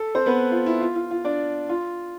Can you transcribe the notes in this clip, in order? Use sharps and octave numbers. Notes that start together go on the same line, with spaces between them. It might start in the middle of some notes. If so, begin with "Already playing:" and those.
Already playing: A4
C4 C5
B3 B4
F4
E4
F4
F4
F4
D4 D5
F4